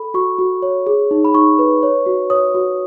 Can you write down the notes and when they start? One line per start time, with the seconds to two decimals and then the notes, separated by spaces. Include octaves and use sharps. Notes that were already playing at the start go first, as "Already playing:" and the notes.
Already playing: A4 B5
0.14 F#4 C#6
0.38 F#4
0.62 C#5
0.87 G#4
1.11 D#4
1.25 B5
1.35 D#4 C#6
1.59 B4
1.83 C#5
2.06 F#4
2.30 C#5 D#6
2.54 F#4